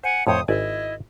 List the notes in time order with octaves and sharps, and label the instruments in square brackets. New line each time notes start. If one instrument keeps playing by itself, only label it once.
[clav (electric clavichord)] C5 [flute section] F#5 G#5
[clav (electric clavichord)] F2 A2 [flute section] C5 C#5 D#6
[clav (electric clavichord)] G#1 D5 G#5 [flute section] E4 D#5